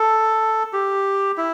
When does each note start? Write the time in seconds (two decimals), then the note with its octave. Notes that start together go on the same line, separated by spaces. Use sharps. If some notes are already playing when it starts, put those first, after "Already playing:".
Already playing: A4
0.73 G4
1.38 E4